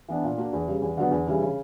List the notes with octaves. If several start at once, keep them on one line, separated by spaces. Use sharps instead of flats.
E3 B3 D4
A#2
A#3 D4 F#4
E2
C#3 G3
E2
D3 F#3 B3
E2
C#3 E3 G3
C#3